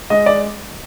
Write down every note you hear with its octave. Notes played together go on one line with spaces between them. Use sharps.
G#3 D#5
D5